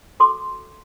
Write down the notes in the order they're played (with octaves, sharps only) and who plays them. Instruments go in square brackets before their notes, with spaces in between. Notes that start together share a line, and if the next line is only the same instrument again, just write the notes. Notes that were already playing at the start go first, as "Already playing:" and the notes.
[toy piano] F#4 A4 C6 D6